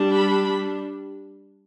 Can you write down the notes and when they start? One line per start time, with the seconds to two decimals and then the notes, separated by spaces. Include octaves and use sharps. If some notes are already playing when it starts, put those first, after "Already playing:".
Already playing: G3 D4
0.15 B5